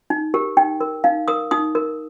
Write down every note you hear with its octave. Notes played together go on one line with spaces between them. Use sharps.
D#4
G4 A#4
D#4 G5
A#4
D#4 F5
A#4 D#6
D#4 D#6
A#4